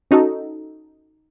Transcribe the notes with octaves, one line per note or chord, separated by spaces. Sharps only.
C#4 D#4 F#4 A4